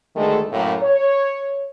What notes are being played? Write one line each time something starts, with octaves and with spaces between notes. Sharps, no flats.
D2 D#3 G#3 A3 A4
F#2 A2 A#3
C#5